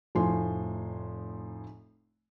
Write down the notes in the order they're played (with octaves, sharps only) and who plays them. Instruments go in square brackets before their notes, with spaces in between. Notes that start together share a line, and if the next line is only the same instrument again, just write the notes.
[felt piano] F1 A2 F3 G#5 C6